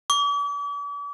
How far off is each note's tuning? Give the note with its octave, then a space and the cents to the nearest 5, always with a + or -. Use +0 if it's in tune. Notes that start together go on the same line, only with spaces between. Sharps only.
D6 -45